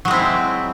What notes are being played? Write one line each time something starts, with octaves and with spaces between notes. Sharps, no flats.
F#3 G#3 C4 E4